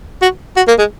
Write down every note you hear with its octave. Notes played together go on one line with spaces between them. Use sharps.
F#4
F#4
A#3
G#3